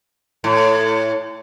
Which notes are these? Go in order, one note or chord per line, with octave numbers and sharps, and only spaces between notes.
A2